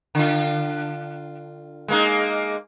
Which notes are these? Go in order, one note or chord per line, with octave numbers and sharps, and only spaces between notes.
D3 F4
G#3 A#3 D#4